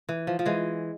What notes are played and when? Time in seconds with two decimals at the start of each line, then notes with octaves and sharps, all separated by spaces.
0.09 E3
0.27 F3
0.39 F3
0.46 E3 G#3